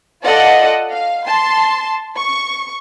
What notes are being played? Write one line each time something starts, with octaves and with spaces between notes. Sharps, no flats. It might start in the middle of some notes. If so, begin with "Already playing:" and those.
F4 A4 D5 D#5 F#5
F5
A5 C6
C#6